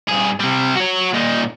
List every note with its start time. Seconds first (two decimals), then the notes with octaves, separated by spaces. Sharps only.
0.09 G2 G#4
0.40 C3 G3
0.76 F#4 C#5
1.13 A#2 D#4